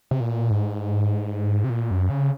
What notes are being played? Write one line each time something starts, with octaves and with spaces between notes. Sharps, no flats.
C3
A#2
G#2
C3
A#2
F#2
C#3